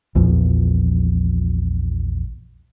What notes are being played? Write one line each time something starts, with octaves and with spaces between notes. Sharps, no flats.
A#1 E2 A#2 F3